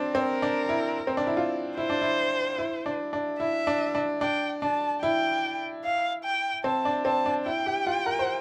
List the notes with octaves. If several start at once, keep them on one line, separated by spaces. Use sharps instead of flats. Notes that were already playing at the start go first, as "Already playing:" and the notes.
Already playing: C4 D4
C4 A#4
D4
E4
C4
D4
E4
F4
E4 C5
D4
E4
E4
D4
D4
E4 E5
D4
D4
D4 G5
D4 A5
E4 G5
F5
G5
C4 A5
D4
C4 A5
D4
E4 G5
G4
F4
A#4
C5